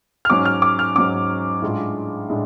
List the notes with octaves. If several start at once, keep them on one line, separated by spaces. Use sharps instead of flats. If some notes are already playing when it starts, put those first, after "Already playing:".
F6
G#2 F#3 C#4 D6
F6
D6
F6
G#2 F#3 C#4 D6
A2 G#3 D4 F4
A2 G#3 D4